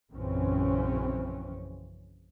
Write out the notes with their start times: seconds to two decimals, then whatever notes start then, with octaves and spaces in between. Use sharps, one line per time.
0.12 A#1 F#2 C#3 E3 C4 C#4